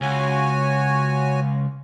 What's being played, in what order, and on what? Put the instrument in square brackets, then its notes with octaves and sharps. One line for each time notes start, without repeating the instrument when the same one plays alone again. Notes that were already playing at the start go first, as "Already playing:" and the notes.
[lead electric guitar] C#2 [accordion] F#4 C#5 G#5